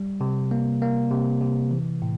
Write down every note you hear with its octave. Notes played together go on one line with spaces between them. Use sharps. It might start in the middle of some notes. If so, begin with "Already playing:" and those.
Already playing: G3
C3
A#3
A#3
C3
C3
E3
A2